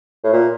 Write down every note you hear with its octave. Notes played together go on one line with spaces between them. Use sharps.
A2
A#2